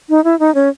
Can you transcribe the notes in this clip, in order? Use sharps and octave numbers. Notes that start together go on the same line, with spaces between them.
D#4
E4
D#4
C#4